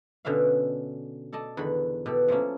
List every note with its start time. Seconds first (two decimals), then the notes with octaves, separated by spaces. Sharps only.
0.25 B2 D3 C#4 E5 F5
1.33 A4 D5 D#5 A5
1.57 E2 D3 D#3 F#4 B5
2.06 B2 G4 A4
2.28 F3 F#3 A3 A#3 C#4